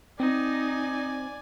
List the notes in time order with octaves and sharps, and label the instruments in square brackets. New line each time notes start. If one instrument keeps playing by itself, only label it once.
[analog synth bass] C4 [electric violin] D#4 [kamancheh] D5 G#5